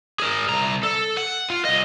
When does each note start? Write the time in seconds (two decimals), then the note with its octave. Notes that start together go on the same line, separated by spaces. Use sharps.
0.20 G#4 A#4
0.48 C2 A#5
0.83 A4
1.17 F#5
1.50 F4
1.65 C2 D#5